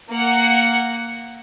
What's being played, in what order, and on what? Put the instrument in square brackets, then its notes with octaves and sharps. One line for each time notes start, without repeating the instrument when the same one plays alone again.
[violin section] A#3 F#5